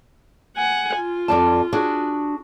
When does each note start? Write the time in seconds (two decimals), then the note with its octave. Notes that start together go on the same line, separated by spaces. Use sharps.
0.57 F#5 G#5
0.97 F4
1.28 F2 D5 A5
1.73 D4 F#4 G#4